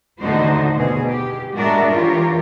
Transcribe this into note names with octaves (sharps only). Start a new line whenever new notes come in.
D#2 A2 D3 D#4 F#4 C5
B2 G#4
G4
A2 G#3 D4 F#4 A#4 E5
E3 F4 G4 A#4 C#5